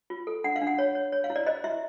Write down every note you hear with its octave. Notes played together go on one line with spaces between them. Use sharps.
F4
A4
D4 F#5
F5
D4
F#5
C#5
C#5
C#5
F5
E4
D5
C5 D#5
E4 E5